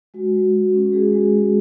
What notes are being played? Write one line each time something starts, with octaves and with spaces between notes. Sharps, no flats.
G#3 F#4
G#3
F#4
C#4
G#3 G#4
G#3
F#4